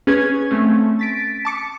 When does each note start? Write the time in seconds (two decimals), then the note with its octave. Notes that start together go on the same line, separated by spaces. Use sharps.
0.07 C#4 G#4 B4 G#6
0.51 A3 C4 C#4
0.99 A6 B6 D7
1.45 A5 D6 C#7